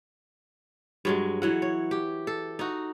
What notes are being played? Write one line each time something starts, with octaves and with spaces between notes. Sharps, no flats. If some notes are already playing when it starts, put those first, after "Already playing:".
G2 F#3 G#3
E3 F#3 F#5
C#5
G4
A4
D#4 F#4